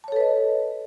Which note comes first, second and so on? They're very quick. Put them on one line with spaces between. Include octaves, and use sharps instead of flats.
A5 C#5 A4 B4 D#5